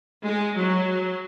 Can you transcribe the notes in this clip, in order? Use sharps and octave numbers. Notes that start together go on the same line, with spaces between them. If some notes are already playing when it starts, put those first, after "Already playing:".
G#3
F#3